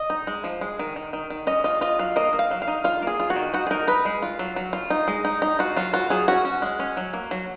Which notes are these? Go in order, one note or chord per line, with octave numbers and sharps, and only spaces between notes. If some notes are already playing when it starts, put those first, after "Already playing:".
Already playing: D#5
D#4
G#3
F3
G#3
D#3
D#3
D#3
D#3
C#4 D#5
F4 D#5
F4 D#5
F#3 F5
A#3 D#5
A#3
F5
F#3
F5
D#4
F4 F5
A#3 G#4
F4
F#4
D#3
D#4 F#4
G#4
D#4 A#4
D#4 B4
G#3
F4
F#3
F#3
F4
D#4
G#3
D#4
D#4
F4 F#4
F#3 F4
F4 F#4
F#3 G#4
C#4 F#4
C#4
G#3
C#4
F#3
A#3
F#3